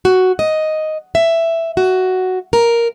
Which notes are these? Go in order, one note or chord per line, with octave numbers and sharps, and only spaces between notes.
F#4
D#5
E5
F#4
A#4